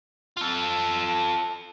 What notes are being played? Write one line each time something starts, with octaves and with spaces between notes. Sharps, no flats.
F4 A4